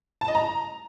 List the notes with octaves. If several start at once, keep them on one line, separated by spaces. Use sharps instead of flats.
A5
D#5
A#5